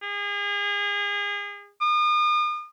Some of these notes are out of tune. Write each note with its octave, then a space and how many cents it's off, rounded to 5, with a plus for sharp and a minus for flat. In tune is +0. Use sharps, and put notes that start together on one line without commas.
G#4 -35
D#6 -40